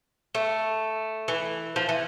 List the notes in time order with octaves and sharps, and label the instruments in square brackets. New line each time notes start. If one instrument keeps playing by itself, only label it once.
[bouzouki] A3
E3
F3
E3